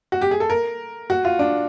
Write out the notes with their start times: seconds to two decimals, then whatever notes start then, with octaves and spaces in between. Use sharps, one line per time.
0.12 F#4
0.21 G4
0.31 G#4
0.40 A4
0.50 A#4
1.10 F#4
1.25 F4
1.39 D4